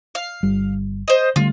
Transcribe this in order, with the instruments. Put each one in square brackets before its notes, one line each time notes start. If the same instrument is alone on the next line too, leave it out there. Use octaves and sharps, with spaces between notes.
[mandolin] F5
[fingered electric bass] G1 G3
[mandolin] C5 D#5
[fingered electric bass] D3 G3 A3 [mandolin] F4